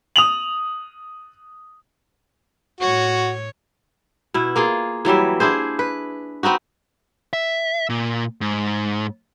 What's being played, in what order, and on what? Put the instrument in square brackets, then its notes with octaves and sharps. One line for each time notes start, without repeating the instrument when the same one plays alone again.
[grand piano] D#6 F7 F#7
[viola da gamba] A2 C#5 [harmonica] F#4
[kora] B2 E4
A#3 F4 G#4
E3 F#3 G3 E5
D4 E4 G#4 C5
B4
B3 C4 D#4 F#4
[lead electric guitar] E5
A#2
G#2